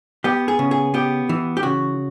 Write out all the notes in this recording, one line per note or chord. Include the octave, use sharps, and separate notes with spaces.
B3 G4
G#4
C#3
G#4
B3 G4
E3
G4
C#3 F#4